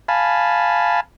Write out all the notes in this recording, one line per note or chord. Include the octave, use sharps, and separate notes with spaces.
F5 G#5 A5 B5